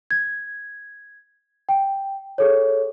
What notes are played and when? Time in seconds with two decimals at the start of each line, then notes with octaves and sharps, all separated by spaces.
0.11 G#6
1.69 G5
2.38 G#4 A4 C#5